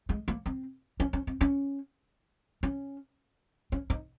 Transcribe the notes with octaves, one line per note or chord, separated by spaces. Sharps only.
G#3
A#3
C4
C#4
C#4
C4
C#4
C#4
C#4
D#4